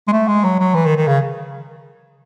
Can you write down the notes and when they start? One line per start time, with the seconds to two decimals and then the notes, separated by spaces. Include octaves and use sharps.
0.08 G#3
0.12 A3
0.28 G#3
0.44 F#3
0.59 F#3
0.75 E3
0.86 D#3
0.96 D#3
1.07 C#3